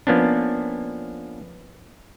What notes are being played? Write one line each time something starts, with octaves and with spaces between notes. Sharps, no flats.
F3 A#3 B3 C#4 D4